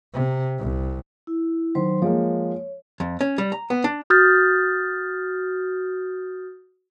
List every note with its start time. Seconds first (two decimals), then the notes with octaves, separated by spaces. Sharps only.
0.14 C3
0.59 C2
1.27 E4
1.75 D#3 F#3 C5 C6
2.02 F3 G#3 A#3 C#5
3.00 F2
3.21 C#4
3.38 G3
3.52 A#5
3.70 B3
3.84 D4
4.10 F#4 D#6 F6 G6 A6